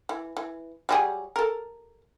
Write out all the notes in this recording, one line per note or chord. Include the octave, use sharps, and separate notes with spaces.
E3
E3
F#3 G3 G#4
A4 A#4